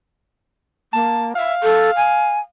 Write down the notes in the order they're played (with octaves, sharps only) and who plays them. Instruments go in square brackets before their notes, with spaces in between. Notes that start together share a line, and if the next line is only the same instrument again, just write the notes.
[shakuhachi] A#3 [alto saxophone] A5
[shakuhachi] E5 [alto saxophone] F5
[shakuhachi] A4
G#5